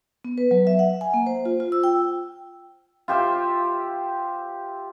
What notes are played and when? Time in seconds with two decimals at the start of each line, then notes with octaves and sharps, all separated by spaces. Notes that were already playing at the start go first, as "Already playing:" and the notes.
0.25 B3
0.38 B4
0.51 F#3
0.67 E5
0.79 F#5
1.01 G#5
1.14 A#3
1.26 C5
1.45 F4
1.60 F4
1.72 E6
1.84 G5
3.08 F4 G4 C5 E5